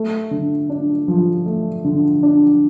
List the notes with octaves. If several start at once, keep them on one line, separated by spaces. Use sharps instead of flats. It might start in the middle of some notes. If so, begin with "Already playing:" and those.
Already playing: A3
D3
D4
F3
A3
D3
D4